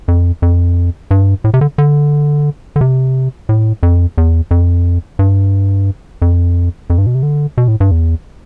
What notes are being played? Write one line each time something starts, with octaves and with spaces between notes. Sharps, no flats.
F2
F2
G2
A2
C3
D3
D3
D3
C3
A2
F2
E2
F2
G2
F2
F2
G2
B2
C3
D3
B2
A2
G2
E2